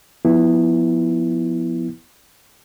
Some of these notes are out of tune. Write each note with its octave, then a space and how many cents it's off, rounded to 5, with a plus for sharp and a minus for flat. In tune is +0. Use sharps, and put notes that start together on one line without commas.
F3 +5 B3 +5 E4 +0